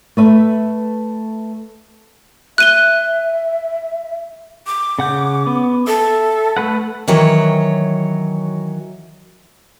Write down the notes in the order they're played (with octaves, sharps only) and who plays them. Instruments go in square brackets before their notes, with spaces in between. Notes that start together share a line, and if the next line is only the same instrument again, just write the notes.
[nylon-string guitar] A3 B4 E5
[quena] E5 [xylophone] F#6 D#7 G7
[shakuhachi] D6
[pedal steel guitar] C#3 F#5 G6
B3
[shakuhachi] A4 [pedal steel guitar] E5
[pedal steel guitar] A3 B4 F#5
[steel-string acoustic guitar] D#3 E3 F#3 C#5